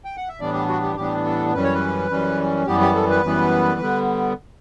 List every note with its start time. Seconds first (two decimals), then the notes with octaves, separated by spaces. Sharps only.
0.05 G5
0.17 F#5
0.29 E5
0.40 A2 E3 G3 B3 D4 D5
0.54 G4
0.68 F#4
0.83 G4
0.96 A2 E3 G3 B3 D4 G4
1.26 A4
1.54 F#2 E3 G3 C#4 B4
1.64 C#5
1.74 B4
2.10 F#2 E3 G3 C#4
2.67 F#2 E3 G3 B3 G4
2.81 G4
2.95 A4
3.10 B4
3.24 F#2 E3 G3 B3
3.81 D3 G3 B3